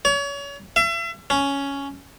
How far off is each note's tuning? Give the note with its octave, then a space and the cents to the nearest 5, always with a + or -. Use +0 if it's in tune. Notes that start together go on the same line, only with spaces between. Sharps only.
C#5 +35
E5 +40
C#4 +5